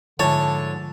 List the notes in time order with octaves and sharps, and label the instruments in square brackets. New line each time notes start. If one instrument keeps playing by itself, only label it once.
[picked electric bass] G#2 F3 [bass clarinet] D3 [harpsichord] C#5 [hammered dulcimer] A5